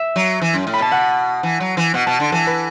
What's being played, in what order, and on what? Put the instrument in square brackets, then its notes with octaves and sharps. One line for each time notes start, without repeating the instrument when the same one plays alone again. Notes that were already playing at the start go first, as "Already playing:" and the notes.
Already playing: [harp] E5
[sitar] F#3
E3
F#2
A2
[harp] B5
[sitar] B2 [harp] A5
[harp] F#5
[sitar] E3
F#3
E3
[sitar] B2 [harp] F#5
[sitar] B2 [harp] A5
[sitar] D3
[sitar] E3 [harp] A4
[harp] B4